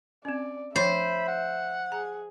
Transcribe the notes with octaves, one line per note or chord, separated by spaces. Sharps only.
C4 C#4 D5
F3 C5 C#5 E5 B5
F#5
G#4 A#5